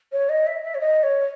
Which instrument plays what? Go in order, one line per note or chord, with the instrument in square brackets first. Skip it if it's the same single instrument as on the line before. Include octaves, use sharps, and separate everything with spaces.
[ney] C#5
D#5
E5
E5
C#5
D#5
C#5